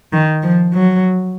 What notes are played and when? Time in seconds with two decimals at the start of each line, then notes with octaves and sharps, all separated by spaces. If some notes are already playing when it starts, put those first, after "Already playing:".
0.13 D#3
0.42 F3
0.73 F#3